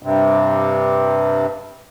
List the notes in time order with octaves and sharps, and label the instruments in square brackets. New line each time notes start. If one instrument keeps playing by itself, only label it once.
[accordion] G2 C3